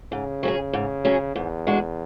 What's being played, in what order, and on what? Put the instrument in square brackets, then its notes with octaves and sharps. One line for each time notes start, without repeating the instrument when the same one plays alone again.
[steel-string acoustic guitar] G#2 [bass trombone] C#3
[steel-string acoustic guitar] F#3 C#4 G#4
G#2
F#3 C#4 G#4
[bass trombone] E2 [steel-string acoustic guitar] G#2
[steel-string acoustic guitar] G#3 D4 F#4